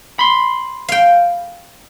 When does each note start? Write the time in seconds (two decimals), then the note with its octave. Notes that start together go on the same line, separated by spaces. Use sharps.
0.19 B5 C6
0.89 F5 G5